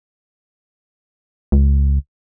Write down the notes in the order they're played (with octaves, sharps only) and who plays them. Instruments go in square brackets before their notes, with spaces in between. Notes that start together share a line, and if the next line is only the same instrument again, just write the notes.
[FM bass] C#2